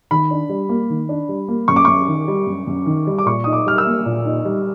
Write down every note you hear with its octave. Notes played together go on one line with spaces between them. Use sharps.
D#3 B5
D4
G3
A#3
D#3
D4
G3
A#3
F#2 C#6
D6
F#2 C#6
D#3
G3
F#2
F#2
D#3
G3
D6
A#2 C#6
D#4 D#6
D6
G3 F6
E6
A#3
A#2
D#4
G3